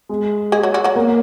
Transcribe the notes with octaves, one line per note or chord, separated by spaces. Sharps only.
G#3
G#3 G#4
F#3 F#4
F#3 F#4
F#3 F#4
A#3